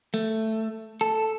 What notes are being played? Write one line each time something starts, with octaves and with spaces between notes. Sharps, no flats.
A3
A4